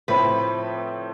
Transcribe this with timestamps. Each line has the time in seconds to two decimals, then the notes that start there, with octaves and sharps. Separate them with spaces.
0.08 A2 F3 A3 C4 B4